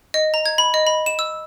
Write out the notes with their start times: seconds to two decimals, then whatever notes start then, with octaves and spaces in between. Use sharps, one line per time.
0.14 D#5
0.34 A#5
0.46 G#6
0.58 B5
0.74 D#5
0.87 B5
1.06 E7
1.19 E6